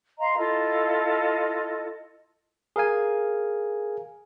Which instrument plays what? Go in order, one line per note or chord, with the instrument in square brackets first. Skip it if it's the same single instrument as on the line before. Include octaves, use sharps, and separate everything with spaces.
[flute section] D#5 F5 A#5 C6
E4 F4 A4 D#5
[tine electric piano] G#4 A#4 F5 G#5